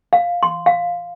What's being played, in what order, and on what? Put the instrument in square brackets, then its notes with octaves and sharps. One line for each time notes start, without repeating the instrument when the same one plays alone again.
[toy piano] F5
C6
F5